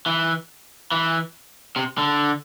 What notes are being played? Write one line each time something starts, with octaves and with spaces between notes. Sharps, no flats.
E3
E3
C3
D3